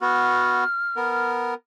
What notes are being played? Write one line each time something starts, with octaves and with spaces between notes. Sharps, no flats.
B3 F#4 F6
B3 A#4